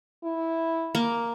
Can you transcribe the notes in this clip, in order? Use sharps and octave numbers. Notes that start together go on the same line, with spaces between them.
E4
A#3